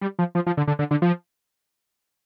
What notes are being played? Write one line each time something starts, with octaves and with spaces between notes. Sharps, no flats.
G3
F3
F3
F3
D3
D3
D3
D3
F3